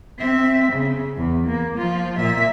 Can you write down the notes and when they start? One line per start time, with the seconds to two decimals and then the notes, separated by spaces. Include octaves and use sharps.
0.19 C4 E5
0.72 C#3
1.17 E2
1.47 A#3
1.78 F3 F4
2.18 A#2 E5